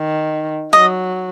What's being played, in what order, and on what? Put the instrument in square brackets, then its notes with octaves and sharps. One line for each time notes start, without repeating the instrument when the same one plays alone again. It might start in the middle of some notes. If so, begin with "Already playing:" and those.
Already playing: [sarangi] D#3
[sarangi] F#3 [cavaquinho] D#5